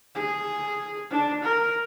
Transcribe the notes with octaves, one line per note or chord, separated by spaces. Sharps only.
G#4
D4
A#4